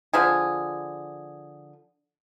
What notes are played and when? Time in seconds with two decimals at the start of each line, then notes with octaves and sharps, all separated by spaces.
0.14 D3 F3 G#4